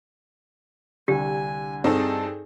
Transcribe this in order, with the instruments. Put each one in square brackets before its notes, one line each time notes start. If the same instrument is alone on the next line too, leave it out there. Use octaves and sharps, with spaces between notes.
[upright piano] C2 D3 [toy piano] G4 [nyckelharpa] G#5
[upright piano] G2 [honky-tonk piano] C4 D#4 A4 [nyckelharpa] G#4